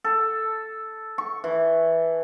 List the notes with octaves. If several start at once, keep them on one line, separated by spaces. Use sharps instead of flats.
A4
C#6
E3